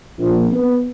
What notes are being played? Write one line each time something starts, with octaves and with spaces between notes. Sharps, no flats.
A#1
B3